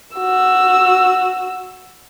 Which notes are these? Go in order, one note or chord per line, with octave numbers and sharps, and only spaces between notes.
F#4 E6